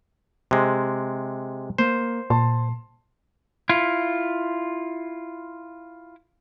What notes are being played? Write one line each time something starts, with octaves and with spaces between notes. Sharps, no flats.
C3 G#3
A#3 C5
A#2 A5 C6
E4 F4